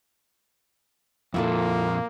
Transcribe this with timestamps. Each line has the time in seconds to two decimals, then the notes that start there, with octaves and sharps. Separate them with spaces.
1.34 F2 A#2 A#3 E4 F4 A4